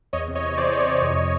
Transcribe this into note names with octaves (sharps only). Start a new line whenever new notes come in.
E2 C#5 D#5
C3
C#5 D#5
E2
E3 C5 D5
E2 C#5 D#5
C3 C#5 D#5
F2
C3